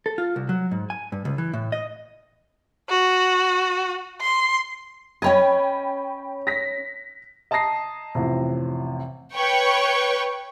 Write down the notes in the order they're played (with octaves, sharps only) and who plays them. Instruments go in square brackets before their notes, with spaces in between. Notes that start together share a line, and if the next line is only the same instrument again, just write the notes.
[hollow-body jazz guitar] A4
F4
C2
F#3
G#2
G#5
G2
C#2
E3
A2
D#5
[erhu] F#4
C6
[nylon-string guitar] C#4 C#5 D#5 [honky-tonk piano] G5 B5 G#6
[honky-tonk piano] A#6 B6
[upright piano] D#5 A5 A#5 D#6 A#6 C7
A1 F2 C3
[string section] B4 C#5 G5 C#6